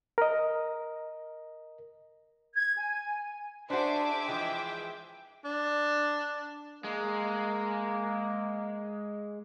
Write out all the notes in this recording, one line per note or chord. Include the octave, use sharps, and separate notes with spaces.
A#4 D#5
G#6
G#5
D4 F#4 G#4 C5 E5 D6
E3 F3 G#3 G5
D4
G#3 A#3